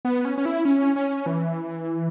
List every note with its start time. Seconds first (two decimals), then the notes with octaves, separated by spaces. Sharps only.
0.05 B3
0.25 C#4
0.38 C#4
0.45 E4
0.65 C#4
0.96 C#4
1.26 E3